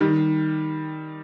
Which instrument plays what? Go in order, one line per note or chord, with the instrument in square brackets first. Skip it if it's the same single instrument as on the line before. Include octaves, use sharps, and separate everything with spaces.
[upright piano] D#3 G3